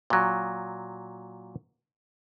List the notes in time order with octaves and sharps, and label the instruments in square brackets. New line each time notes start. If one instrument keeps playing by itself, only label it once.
[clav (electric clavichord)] A#2 F#3